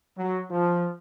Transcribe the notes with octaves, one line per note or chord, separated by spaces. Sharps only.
F#3
F3